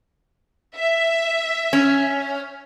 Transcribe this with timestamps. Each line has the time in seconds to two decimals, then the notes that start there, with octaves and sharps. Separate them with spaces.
0.76 E5
1.73 C#4